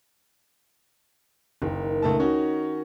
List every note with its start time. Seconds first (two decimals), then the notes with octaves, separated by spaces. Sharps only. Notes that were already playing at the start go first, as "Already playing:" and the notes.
1.62 F#1 D#3
2.02 C#2 A3 A5
2.19 C#4 D#4 F#4